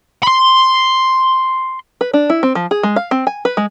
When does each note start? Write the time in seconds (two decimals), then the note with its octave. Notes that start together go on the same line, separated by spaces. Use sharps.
0.23 B5 C6
2.01 B4
2.14 D4
2.30 E4
2.43 C4
2.55 F3
2.71 G#4
2.83 G#3
2.96 F5
3.11 C4
3.27 G#5
3.45 B4
3.57 G#3